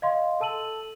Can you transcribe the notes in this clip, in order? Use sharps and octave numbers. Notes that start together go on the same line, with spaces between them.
D#5 F5 C6
A4 A5 E6 D#7 F#7